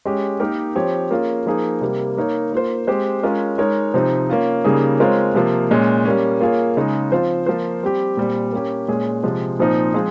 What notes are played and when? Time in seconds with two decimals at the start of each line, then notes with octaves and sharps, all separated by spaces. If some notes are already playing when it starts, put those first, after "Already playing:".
0.05 G#3 C#4 G4
0.40 A#3 D#4 G4 A#4
0.75 F3 C4 G4 C#5
1.11 A#3 C#4 F4 G#4
1.46 F3 A#3 D#4 G#4
1.81 C3 G3 A#3
2.17 A#3 D#4 A#4 C#5
2.52 A#3 F4 C5
2.87 G#3 C4 G4 C5
3.23 G#3 C#4 F4 A#4 C#5
3.58 G#3 D#4 A#4 C#5
3.94 C3 F3 C4 D#4
4.30 A#3 C#4 F4
4.64 C#3 G3 A#3 D#4 G#4
5.00 G#3 C4 F4 A#4 C#5
5.35 C3 F3 A#3
5.71 A#2 G#3 C#4
6.05 G3 A#3 C#4
6.40 A#3 F4 G#4 C#5
6.77 C#3 G#3 D#4
7.12 F3 C4 F4 C5
7.46 F3 A#3 F4 C5
7.83 G3 C4 G4
8.17 A#2 G3 C4
8.52 A#3 C#4 G4
8.88 A#2 G#3 C#4 G#4
9.23 C3 F3 G#3
9.59 A#2 F3 C4 D#4
9.94 F3 G#3 C4 F4 G#4